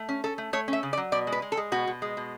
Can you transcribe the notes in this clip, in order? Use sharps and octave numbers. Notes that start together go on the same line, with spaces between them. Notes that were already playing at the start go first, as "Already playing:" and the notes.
Already playing: A3
C#4
C#4 A4
A3
A3 C#5
C#4
E5
C#3
D5
F#3
B2 D5
G#3
B4
G#3
A4
G#3
B2 F#4
B2
G#3
B2